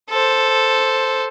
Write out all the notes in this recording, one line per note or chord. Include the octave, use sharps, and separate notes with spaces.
A4 C5